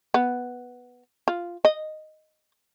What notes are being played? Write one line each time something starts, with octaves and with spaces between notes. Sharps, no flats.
B3
F4
D#5